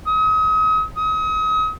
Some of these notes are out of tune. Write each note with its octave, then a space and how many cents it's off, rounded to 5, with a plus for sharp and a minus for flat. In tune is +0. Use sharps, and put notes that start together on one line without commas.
D#6 +35
D#6 +35